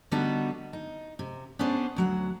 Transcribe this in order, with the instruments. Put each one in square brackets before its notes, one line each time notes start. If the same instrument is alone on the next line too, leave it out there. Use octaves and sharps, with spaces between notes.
[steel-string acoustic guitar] D3 G3 B3 D4 D#4 F#4
D#4
C3
B3 C#4 D4 G#4 C5 D5
D2 F#3 F#5